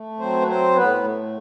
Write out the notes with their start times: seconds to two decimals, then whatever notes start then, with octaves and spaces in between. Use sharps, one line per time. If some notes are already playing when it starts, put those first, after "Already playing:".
Already playing: A3
0.20 F#3 C4 C5
0.42 B4
0.47 C4 C5
0.76 A2 B3 B4
1.04 A3